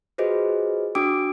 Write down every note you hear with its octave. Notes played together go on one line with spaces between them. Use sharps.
F4 F#4 G#4 B4 C5 D#5
D4 F#4 G5 D6 D#6 D7